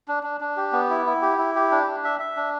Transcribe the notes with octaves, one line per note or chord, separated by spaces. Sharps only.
D4
D4
D4
G4
B3
E4
E4
G4
E4
G4
D4
D4
E5
E5
D4